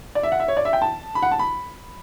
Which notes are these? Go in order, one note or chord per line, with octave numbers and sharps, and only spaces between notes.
D5
E5
F#5
E5
C#5
D5
E5
G5
A5
B5
F#5
A5
B5